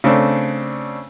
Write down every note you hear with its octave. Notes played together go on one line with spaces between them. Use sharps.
C#3 A3 C4 D4